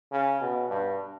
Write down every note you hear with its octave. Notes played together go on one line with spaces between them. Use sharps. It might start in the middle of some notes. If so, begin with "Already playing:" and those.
C#3
B2
G2